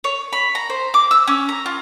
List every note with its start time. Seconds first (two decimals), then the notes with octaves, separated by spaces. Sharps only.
0.04 C#5
0.33 B5
0.55 A#5
0.70 C5
0.94 D6
1.11 E6
1.27 C#4
1.49 A#5
1.66 F4